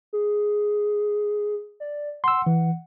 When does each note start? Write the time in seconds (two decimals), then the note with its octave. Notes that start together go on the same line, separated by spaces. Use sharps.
0.13 G#4
1.80 D5
2.24 F#5 C6 E6
2.47 E3